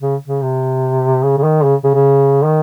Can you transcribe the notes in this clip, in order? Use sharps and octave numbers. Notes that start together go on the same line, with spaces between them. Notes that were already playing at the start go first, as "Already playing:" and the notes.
C#3
C#3
C3
C#3
C#3
D#3
C#3
C#3
C#3
D#3